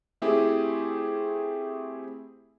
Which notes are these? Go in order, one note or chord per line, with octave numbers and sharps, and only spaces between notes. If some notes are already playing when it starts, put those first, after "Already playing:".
A3 C4 E4 G4 G#4